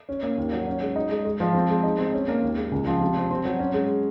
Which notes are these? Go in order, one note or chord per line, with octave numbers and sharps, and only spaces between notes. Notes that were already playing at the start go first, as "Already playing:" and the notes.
C#4
A#3
D#2
F#3
C#4
G#3
D#4
G#3
G#3
F3
C4
G#3
D#4
C4
C#4
A#3
D#2
G#3
C#2
F3
C3
C4
C4
F#3
C#4
G#3